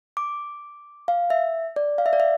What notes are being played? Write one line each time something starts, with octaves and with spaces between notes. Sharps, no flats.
D6
F5
E5
D5
F5
E5
D5
E5